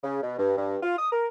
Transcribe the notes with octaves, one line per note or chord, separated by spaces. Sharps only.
C#3
B2
G2
G2
F4
D#6
A#4